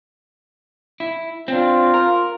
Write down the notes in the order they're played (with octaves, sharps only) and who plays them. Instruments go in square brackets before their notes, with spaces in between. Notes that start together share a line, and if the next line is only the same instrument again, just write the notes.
[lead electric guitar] E4
[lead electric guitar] C4 D4 [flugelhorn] F4
[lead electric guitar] A#4